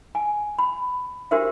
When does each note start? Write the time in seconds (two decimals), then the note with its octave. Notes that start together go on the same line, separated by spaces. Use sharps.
0.15 G#5
0.59 B5
1.31 D4 F#4 G4 A#4 C5 E5